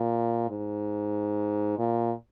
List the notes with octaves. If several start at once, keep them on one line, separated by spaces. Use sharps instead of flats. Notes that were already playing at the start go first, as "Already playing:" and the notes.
Already playing: A#2
G#2
A#2